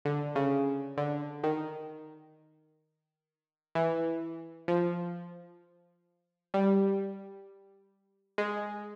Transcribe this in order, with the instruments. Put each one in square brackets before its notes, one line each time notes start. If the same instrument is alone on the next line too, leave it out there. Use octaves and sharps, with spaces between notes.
[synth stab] D3
C#3
D3
D#3
E3
F3
G3
G#3